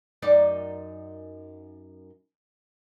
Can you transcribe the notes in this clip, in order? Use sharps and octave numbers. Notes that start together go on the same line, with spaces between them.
F#2 D#4 D5